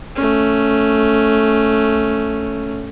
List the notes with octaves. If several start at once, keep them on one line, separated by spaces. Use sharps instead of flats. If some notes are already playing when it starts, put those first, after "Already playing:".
A3 C#4